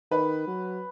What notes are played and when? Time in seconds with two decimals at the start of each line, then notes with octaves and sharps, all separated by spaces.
0.11 D#3 B4
0.47 F#3